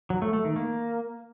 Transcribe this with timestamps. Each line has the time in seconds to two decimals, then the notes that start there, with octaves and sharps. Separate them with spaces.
0.10 F#3
0.22 A3
0.33 A3
0.45 D#3
0.56 A#3